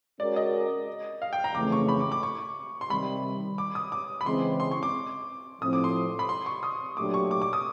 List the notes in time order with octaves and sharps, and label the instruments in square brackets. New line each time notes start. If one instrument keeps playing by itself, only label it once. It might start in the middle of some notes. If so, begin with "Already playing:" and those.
[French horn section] G#3 C#4 F#4 A#4 [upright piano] D5
[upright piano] D#5
F5
G5
A#5
[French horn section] F2 C#3 E3 A3 [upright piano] D6
[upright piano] C#6
B5
D6
D6
C#6
C6
[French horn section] C3 D#3 G3 [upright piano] B5
[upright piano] D6
D#6
D6
B5
[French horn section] C#3 E3 G#3 C4 [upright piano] C6
[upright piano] C6
C#6
D6
[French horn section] A2 F3 A3 C4 [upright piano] D#6
[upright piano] D6
C6
B5
C6
C#6
D#6
[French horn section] A#2 F#3 A3 D4 G4 [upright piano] D6
[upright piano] C#6
D6
D6
D#6